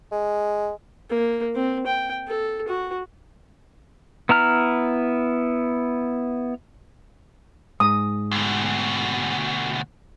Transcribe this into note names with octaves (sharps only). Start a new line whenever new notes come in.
G#3
A#3
C4
G5
A4
F#4
B3 E4 A#5 F6
G#2 D#6
D2 B2